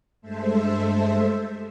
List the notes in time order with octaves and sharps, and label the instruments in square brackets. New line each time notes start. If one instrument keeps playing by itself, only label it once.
[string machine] G2 G#3 A3 A4 C5 E5